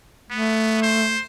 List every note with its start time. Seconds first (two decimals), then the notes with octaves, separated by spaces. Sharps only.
0.31 A3 B3
0.82 C5